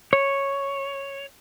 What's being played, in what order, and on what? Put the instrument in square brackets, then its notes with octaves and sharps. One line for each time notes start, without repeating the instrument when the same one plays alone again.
[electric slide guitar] C#5